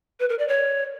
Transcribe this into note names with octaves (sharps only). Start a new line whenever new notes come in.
B4
A#4
D5
C#5